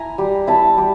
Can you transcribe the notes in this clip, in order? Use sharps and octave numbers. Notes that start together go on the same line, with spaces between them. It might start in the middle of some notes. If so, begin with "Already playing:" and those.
Already playing: E4 G#5 A#5
G3
E4 A5 B5
G3